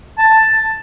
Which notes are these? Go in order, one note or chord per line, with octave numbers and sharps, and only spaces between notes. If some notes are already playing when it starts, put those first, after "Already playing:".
A5